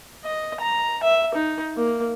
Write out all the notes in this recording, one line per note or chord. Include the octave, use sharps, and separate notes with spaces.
D#5
A#5
E5
D#4
A#3